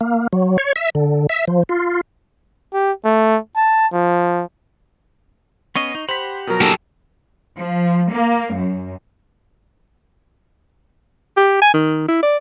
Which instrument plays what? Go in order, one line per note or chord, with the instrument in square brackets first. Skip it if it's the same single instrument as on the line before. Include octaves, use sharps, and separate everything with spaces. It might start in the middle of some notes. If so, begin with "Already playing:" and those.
[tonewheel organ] A#3
F#3
C#5
E5
D3
E5
F3
F4
[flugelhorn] G4
A3
A5
F3
[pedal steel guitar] B3 C#4 D#5 [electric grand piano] C#6 A#6 C7
[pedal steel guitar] D#4
[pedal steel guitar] G4 F#5 B5 [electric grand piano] C5 B6
[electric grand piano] B2 F3 F#3 [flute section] A#4
[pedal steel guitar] A#3 D4 E4 [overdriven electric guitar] G4 A4
[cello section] F3
A#3
F#2
[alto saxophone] G4
G#5
D#3
E4
D5